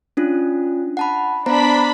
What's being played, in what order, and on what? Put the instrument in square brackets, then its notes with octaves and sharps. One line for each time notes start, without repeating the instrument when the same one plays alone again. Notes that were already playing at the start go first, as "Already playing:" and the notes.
[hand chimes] C#4 D4 F4
F#5 A5 B5
[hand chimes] B3 C5 A#5 [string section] D4 B5